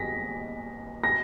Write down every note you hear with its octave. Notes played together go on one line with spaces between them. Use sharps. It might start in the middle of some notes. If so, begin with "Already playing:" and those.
Already playing: A#6 B6
A#6